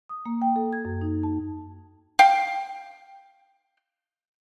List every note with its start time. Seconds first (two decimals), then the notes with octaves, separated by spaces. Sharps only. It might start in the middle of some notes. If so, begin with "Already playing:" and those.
0.09 D#6
0.26 A#3
0.42 G5
0.56 A4
0.73 G#6
0.85 F#2
1.01 D#4
1.23 A5
2.19 F5 G5